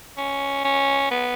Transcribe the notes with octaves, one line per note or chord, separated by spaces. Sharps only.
C#4
C#4
B3